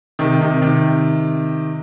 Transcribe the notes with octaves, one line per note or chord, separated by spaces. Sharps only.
C3 D#3
C3 D#3
C3 D#3